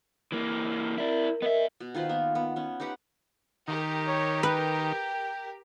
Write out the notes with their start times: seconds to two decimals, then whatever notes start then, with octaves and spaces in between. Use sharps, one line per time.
0.32 E3 A#3
0.98 E4 A#4 D5
1.42 B3 A#4 D#5 E5
1.80 B2
1.95 D#3 F4 B4 C5
2.09 A#3 B3
2.35 B3
2.56 B3 C#4
2.80 D#4 G4 B4 F#5
3.68 D#3 G4 A#4
4.07 C#5
4.43 B4 G5